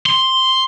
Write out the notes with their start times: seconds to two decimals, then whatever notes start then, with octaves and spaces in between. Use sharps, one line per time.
0.06 C6